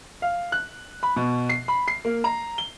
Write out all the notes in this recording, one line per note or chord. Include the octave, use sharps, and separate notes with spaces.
F5
F#6
B5
B2
C7
B5
C7
A#3
A#5
G7